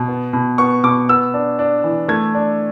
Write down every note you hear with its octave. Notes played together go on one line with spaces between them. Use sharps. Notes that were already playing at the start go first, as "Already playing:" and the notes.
Already playing: B2
B3
B2
B3 C#6
B2 D6
B3 E6
D4
D4
E3
A3 G#6
D4